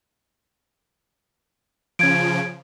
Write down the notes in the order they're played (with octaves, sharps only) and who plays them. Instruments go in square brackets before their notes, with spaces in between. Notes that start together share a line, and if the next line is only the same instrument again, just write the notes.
[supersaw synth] C#3 F3 [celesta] G#6 D7